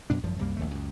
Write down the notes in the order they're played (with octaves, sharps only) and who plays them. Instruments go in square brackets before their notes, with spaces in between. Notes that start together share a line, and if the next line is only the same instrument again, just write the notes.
[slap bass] F#2 B2 D4
G#1 F#2 F3
C2 F#2 G3 A#3
A#1 D#2 A3
C#2 F#2